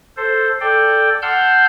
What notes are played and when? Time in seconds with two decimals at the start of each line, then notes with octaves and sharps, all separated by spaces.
0.17 A4 C5
0.61 A4 D5 G5
1.22 F#5 A5 C6 E6 F6 G6